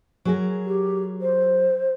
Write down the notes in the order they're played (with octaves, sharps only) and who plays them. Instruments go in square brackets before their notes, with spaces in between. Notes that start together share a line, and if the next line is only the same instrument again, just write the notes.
[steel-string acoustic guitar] F#3 G#4 A#4
[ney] G4
C5